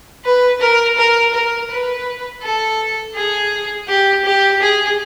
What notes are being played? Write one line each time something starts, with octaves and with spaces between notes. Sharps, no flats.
B4
A#4
A#4
A#4
B4
A4
G#4
G4
G4
G#4